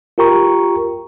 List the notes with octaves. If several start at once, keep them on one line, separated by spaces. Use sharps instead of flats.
F4 G4 A#4 G5 A#5 C#6